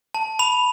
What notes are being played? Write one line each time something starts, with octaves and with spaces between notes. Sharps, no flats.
A5
B5 F7